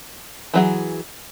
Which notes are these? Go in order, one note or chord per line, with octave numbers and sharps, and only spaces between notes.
E3 F#3 G#4